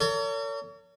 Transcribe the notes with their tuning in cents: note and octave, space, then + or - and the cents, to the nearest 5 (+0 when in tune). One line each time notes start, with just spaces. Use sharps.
A#4 -45 C#5 +40